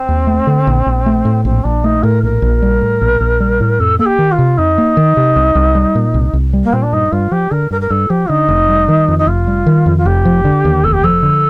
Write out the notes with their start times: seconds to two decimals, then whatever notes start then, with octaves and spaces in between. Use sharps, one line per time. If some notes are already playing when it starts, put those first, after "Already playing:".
Already playing: C4
0.09 D#2
0.27 A3
0.47 D3
0.67 A#1
0.86 A#1
1.06 A3
1.25 A2
1.45 A#1 C4
1.64 A#1 D4
1.84 A3 D#4
2.03 A2 A#4
2.23 A#1 A#4
2.42 A#1
2.62 G3
2.81 A2
3.01 A#1
3.20 A#1
3.40 G3
3.60 A2
3.80 F2 A4
3.99 A#3 A4
4.06 G4
4.19 D#3
4.32 F4
4.39 C3
4.58 F2 D#4
4.78 A#3
4.97 D#3
5.17 C3
5.36 C2
5.55 C2
5.75 G3
5.95 A#2
6.14 C2
6.33 C2
6.53 G3
6.64 A#3
6.73 A#2 C4
6.82 D4
6.93 G2 D#4
7.12 G2 F4
7.32 F3 G4
7.51 D3 A#4
7.71 G2 A#4
7.81 A#4
7.90 G2 A4
8.10 F3 G4
8.29 D3 D#4
8.48 F1
8.69 G3
8.88 D#3
9.08 F2
9.18 D#4
9.27 F1 F4
9.47 G3
9.66 D#3
9.86 F2
9.98 F4
10.05 F1 G4
10.25 F3
10.45 D3
10.65 D#2
10.84 F1 A4
10.93 G4
11.04 F3 A4
11.23 D3